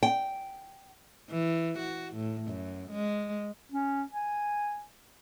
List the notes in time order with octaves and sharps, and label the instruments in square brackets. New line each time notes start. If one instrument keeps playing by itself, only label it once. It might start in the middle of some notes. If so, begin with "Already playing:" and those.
[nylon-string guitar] G5
[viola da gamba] E3
F#4
A2
F#2
G#3
[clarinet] C#4
G#5